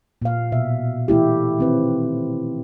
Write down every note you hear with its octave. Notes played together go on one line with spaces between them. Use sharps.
A#2 F5
B2 E5
E3 A3 E4 G4
D#3 C4 B4